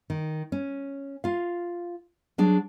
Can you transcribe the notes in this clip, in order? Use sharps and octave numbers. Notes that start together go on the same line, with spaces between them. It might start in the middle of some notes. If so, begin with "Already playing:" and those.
D#3
C#4
F4 F5
F#3 D4 G#4